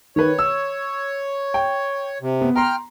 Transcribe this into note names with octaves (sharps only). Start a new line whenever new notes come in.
D#3 B4 C#5
E6
G5
C3
B3
G5 A#5 C6 F6